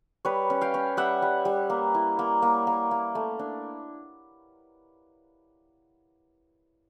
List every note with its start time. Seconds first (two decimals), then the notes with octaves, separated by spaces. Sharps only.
0.25 G3 B4 C#5
0.50 C#4
0.61 F5 G5
0.74 C#4
0.97 G3 E5 F#5
1.22 G3
1.45 G3
1.70 A#3
1.94 E4
2.19 A#3
2.42 A#3
2.67 A#3
2.91 A#3
3.15 A3
3.39 D4